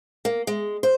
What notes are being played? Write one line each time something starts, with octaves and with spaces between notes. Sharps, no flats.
A#3
G#3
C5